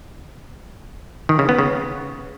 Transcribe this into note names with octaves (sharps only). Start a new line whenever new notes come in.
D#3
C#3
B3
C#3